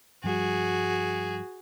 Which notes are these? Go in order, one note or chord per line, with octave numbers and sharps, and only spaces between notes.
G2 F3 G3 F#4 G#4